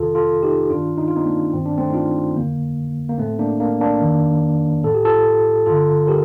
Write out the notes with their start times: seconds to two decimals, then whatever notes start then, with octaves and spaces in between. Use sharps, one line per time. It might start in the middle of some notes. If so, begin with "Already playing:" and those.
Already playing: F2 C3 D#3 F4 A4
0.15 F4 A4
0.43 D#4 G4
0.70 G2 D#3 D4 F4
0.98 D#4
1.08 F4
1.17 C4 D#4
1.26 A#3 D4
1.53 G2 D#3 C4
1.66 D4
1.78 A3 C4
1.90 D#4
1.94 D4 F4
2.36 F2 D3 A#3
3.09 A#3
3.18 A2 A3 C4
3.39 A#3 D4
3.60 A#3 D4
3.81 A#3 D4
4.02 F2 D#3
4.83 A2 A4
4.94 G4
5.05 F4 A4
5.66 G2 D3 F4 A4
6.07 G4 A#4